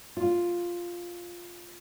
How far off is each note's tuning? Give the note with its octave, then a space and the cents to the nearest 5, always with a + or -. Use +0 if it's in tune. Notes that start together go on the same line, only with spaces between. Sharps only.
F4 +0